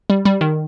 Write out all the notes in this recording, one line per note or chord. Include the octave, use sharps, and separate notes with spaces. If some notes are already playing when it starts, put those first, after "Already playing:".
G3
G3
D#3